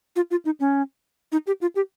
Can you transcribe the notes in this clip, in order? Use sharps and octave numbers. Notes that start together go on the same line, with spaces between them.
F4
F4
D#4
C#4
D#4
G4
F4
G4